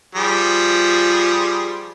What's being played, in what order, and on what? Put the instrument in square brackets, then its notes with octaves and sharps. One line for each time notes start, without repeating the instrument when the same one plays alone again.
[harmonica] F3 G3 G#4